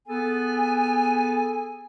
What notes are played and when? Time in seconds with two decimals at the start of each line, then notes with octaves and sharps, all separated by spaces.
0.07 B3 G#4 A4 G#5